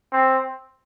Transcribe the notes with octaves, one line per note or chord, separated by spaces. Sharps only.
C4